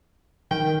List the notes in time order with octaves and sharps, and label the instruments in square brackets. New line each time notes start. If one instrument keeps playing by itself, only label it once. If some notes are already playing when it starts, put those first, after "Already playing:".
[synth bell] D#3 [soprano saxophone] G5